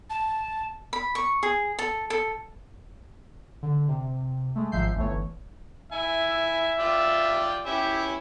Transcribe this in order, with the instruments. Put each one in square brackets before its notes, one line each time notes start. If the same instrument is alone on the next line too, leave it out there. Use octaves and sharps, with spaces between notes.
[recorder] A5
[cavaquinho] B5
C#6
G#4
A4
A4
[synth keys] D3
C3
G#3 A3
G#1 G#2 F3 E5 G6 C7
G1 E3 A3 C#5
[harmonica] E4 G#5 [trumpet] E5
[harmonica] F4 D5 G5
[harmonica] C#4 E4 E5 [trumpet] G4